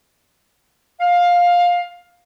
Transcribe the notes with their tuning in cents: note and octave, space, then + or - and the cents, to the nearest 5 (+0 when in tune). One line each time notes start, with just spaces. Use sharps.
F5 +15